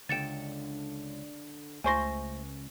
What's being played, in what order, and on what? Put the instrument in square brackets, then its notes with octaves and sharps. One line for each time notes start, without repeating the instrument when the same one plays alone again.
[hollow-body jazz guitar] C#2 G5 [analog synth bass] D3 [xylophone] A6 C#7 E7
[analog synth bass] C#2 [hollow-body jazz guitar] A3 C5 C6 [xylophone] G#5 C#6 A#6